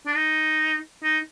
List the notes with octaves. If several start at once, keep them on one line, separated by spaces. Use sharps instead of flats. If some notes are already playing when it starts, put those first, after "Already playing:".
D4
D#4
D#4